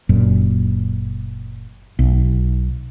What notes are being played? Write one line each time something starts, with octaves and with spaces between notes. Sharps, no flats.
F#1 F#2 A#2
B1